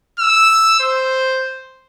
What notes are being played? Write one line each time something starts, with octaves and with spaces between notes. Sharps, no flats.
E6
C5